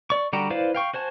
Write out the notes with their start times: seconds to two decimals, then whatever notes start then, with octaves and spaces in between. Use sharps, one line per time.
0.10 D5 C#6
0.33 D3 G3 F#4 G4 A#5
0.50 E4 B4 C5 D5 F5
0.75 F5 G5 C#6
0.94 F#4 C5 G#5 A5